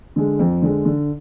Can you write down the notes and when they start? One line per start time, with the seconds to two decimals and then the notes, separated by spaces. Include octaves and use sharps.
0.16 D3 G#3
0.39 F2
0.62 D3 G#3
0.85 D3